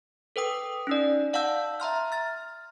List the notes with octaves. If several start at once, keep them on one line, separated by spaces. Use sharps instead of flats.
A4 B4 G5 D#6
C#4 D#4 D5
D5 F5 F#5 A5 E6 G6
E5 A#5 C6 F6
F6 A6